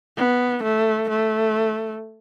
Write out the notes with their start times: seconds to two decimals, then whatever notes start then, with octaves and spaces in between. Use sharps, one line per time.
0.17 B3
0.63 A3
1.09 A3